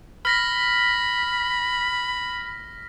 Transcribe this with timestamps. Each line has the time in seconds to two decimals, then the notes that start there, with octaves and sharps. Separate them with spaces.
0.25 B5 F6 A#6 B6